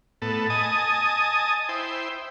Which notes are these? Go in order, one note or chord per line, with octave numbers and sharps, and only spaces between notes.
A2 B3 A4
D#5 G#5 A5 D#6
E4 C5 G5